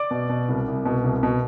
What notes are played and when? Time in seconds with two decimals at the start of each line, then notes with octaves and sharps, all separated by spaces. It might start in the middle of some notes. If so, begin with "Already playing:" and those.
Already playing: D5 D6
0.11 B2
0.29 B2
0.49 C2
0.68 C2
0.86 B2
1.04 C2
1.23 B2